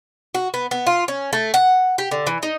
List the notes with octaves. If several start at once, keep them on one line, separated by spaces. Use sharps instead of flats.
F#4
B3
B3
F4
C#4
A3
F#5
G4
D3
E3
D#4